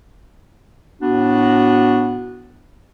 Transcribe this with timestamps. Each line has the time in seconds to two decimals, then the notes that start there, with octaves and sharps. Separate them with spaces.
1.01 A2 B3 D4 F#4